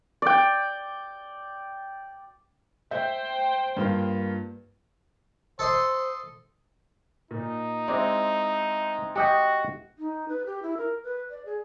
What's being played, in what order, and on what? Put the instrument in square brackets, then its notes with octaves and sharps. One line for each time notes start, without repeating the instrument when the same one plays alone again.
[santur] D5 G5
[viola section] C5 G5 [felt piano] E5 G6
[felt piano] G2 A#3 F4
[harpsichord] A4 D#5 C6 [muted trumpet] C5
[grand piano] A#2 [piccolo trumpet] D#4
[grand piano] G#3 C4 E4 [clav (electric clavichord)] D5
[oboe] F#4 [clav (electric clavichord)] G4 D#5 G5
[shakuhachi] D#4
B4
G4
E4
A#4
B4
D5
G#4